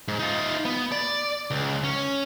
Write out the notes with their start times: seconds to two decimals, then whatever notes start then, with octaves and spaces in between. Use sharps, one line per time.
0.08 G#2
0.19 D#4 F4
0.65 B3
0.92 D5
1.51 C#2
1.84 C#4